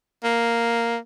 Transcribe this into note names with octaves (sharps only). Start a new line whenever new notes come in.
A#3